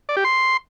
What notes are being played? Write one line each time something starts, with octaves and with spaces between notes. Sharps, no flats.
D5
G4
C6